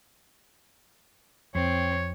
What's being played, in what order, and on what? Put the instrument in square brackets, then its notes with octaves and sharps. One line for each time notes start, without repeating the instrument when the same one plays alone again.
[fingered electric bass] F2 [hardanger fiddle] C4 [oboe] C#5